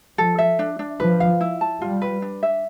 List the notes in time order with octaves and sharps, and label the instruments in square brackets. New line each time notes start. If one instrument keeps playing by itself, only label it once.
[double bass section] F3 [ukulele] A4
[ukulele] E5
D4
D4
[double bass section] F3 [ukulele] B4
[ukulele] F5
E4
A5
[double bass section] G3 [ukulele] F4
[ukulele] B4
D4
E5